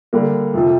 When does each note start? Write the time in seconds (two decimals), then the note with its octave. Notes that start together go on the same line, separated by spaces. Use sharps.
0.13 D3 G3 A#3
0.54 F2 C3 F3